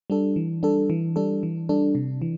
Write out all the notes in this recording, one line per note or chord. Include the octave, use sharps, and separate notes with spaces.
G3 D4 A4
E3
G3 D4 A4
E3
G3 D4 A4
E3
G3 D4 A4
C3
E3